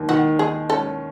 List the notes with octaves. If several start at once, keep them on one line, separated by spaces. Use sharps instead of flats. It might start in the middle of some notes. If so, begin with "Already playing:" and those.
Already playing: D#2
D#3 F#4
D#3 G#4
C#4 A4